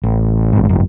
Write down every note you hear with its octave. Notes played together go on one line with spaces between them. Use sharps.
A1
A1 G#2
G#1 F#2